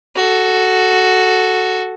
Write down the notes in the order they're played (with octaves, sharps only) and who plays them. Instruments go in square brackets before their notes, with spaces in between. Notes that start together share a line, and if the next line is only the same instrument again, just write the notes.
[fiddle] F#4 A4